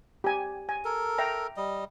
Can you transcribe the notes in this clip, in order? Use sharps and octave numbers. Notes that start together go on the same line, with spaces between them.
G4 G#5
G#5
A4 A#4
E5 G5 A#5
G3 D#5